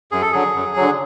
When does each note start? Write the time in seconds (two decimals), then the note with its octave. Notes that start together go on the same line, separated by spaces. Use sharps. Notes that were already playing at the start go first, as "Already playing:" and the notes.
0.12 F#2 G#4
0.22 A4
0.32 D3 F#3 G#4
0.55 F#2
0.76 D3 F#3